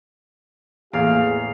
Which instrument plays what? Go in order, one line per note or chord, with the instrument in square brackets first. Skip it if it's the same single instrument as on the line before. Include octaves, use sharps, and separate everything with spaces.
[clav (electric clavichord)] A1 E2 [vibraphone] A#3 [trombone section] G#4 [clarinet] F5